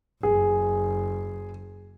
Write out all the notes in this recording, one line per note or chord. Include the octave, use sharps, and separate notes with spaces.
F#1 G#4